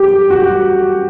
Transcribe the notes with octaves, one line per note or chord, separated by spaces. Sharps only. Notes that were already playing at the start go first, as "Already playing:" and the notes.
Already playing: G4
F#4